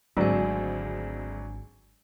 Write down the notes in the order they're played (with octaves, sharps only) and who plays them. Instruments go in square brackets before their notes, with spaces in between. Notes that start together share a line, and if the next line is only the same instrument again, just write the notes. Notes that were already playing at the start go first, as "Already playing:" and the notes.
[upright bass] G#1 [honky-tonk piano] D2 G#3 C4 [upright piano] F#3 D5 [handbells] D4 G#5